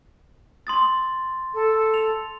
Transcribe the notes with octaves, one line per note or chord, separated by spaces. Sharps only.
C6 D#6 A6
A4
F7